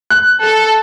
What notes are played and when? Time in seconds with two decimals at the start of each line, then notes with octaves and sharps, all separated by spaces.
0.10 F#6
0.44 A4